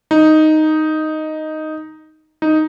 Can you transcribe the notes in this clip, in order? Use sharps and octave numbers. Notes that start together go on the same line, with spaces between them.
D#4
D#4